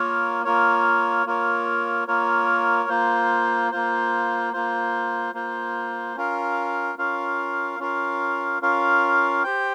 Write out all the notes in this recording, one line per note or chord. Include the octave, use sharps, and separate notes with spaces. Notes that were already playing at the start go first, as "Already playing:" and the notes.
Already playing: A#3 F4 A#4 C#5
A#3 F4 A#4 C#5
A#3 F4 A#4 C#5
A#3 F4 A#4 C#5
A#3 F4 C5
A#3 F4 C5
A#3 F4 C5
A#3 F4 C5
C#4 F4 A#4 F5
C#4 F4 A#4 F5
C#4 F4 A#4 F5
C#4 F4 A#4 F5
G4 C5 G5